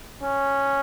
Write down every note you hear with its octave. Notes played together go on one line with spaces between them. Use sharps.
C#4